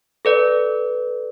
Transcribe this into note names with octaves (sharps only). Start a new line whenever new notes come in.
A4 B4 D5